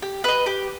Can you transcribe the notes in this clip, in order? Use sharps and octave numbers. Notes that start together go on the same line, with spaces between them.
G4
B4 D#5
G4